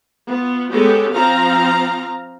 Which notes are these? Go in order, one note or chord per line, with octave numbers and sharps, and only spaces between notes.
B3 F4
G#3 B3 C#4 G4 A4
F3 C4 F5 A#5